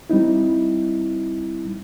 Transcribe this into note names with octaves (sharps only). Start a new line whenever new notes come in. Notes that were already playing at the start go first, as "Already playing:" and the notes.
G3 C4 D#4 E4